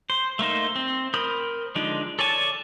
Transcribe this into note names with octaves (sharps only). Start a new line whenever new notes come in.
C5
A3 A#3 D#4 C5
C4
A#4 C5 B5 D#6 G6
D3 F3 G#3 D4 D#4
A4 C#5 D5 G#5 A5